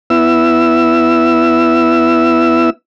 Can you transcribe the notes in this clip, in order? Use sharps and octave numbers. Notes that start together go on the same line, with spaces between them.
B3 E4 E6